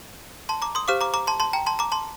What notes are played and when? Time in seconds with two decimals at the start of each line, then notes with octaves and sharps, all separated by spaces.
0.49 A5 C6
0.62 A#5 D6
0.75 C6 D#6
0.88 G4 C5 F5 D6 F6
1.01 A#5 D6
1.14 A#5 D6
1.27 A5 C6
1.40 A5 C6
1.53 G5 A#5
1.66 A5 C6
1.79 A#5 D6
1.92 A5 C6